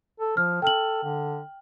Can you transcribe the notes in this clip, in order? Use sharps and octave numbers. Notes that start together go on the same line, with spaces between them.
A4
F3 F6
A4 G5 F6 F#7
D3